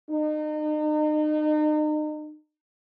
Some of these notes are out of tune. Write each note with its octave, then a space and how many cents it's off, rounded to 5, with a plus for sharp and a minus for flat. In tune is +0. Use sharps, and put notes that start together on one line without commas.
D#4 -35